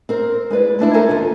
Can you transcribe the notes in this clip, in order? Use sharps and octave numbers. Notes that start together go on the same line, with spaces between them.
C4 A#4 C5
G#3 E4 B4 D5
G#3 A3 D4 E4
A4 A#4 C5 E5 G#5 A#5
D#2 D3 F4